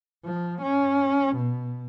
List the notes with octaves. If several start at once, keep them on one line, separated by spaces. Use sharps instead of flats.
F3
C#4
B2